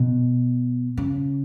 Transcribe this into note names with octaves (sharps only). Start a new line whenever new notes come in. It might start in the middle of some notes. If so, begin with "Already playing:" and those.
Already playing: B2
C#3